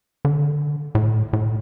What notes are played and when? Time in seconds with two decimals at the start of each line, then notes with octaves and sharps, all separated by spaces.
0.25 D3
0.95 A2
1.33 A2